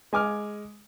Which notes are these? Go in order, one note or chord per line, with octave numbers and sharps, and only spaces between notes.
G#3 G#5 D6 F6